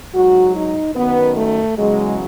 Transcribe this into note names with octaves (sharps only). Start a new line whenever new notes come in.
G#2 F#3 F#4
D#4
F#2 D#3 F#3 B3
A3
E2 C#3 F#3 G#3